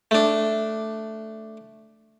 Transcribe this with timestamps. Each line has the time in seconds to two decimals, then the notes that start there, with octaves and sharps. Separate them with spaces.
0.11 A3 D4